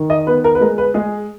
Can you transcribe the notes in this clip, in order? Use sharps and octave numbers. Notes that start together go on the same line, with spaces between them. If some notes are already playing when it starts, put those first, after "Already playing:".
Already playing: D#3
D#5
B3 B4
A#4
B4
G#3 A#4
B4
G#3 G#4